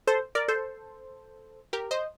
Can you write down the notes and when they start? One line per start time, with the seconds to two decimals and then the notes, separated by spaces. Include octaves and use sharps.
0.07 A4 C5
0.35 A#4 D5
0.48 A4 C5
1.73 G4 A#4
1.91 C5 D#5